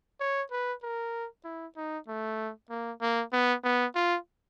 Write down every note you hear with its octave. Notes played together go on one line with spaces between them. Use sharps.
C#5
B4
A#4
E4
D#4
A3
A#3
A#3
B3
B3
F4